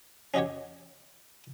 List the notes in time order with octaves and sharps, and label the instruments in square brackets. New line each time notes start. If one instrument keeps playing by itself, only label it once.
[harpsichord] C#4 D#4 F#4 G4 C#5